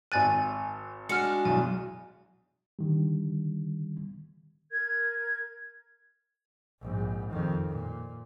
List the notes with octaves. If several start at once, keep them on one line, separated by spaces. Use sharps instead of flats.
G#1 G#5 F#6 A6 D#7
G#3 D4 F#4 F6 C#7
B1 E2 G#5
D3 D#3 G3
A#4 G#6
A#1 G#2
F2 D#3
A#2